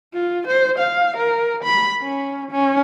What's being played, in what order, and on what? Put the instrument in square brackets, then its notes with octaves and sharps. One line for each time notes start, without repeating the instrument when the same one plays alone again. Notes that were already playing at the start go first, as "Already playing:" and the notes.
[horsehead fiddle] F4
C5
F5
A#4
B5
C#4
C#4